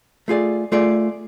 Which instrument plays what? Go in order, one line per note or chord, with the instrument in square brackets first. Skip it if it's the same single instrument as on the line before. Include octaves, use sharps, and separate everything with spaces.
[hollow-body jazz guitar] A3 F4 G#4 D5
A3 F4 G#4 D5